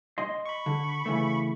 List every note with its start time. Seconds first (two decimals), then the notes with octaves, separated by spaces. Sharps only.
0.18 D#5 C6
0.46 B5 C#6
0.66 D3
1.06 C#3 E3 A3